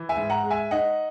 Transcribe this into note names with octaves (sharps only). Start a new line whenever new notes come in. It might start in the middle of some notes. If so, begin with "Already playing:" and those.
Already playing: E3
E5 G#5
G#2
F#5 A#5
G#3
E5 G#5
D#4 D#5 F#5